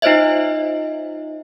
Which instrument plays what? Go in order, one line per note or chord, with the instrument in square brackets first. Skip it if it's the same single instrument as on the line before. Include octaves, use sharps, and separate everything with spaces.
[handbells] D#4 F4 C5 C#5 D#5 E5